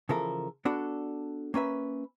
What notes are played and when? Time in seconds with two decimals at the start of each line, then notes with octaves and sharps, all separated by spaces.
0.09 C#3 E3 F3 A4 A#4 E5
0.65 B3 D4 F#4 A4 D5
1.54 A#3 C#4 B4 E5